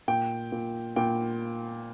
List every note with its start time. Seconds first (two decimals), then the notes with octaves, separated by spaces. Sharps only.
0.08 A#2 G5
0.52 A#2
0.96 A#2 G5